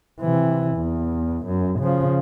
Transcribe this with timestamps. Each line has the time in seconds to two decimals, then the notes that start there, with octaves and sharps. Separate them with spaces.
0.21 C3 E3
0.77 E2
1.46 F#2
1.80 C#3 F3